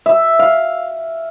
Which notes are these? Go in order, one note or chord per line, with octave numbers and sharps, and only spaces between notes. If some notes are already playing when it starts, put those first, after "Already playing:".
E5
F5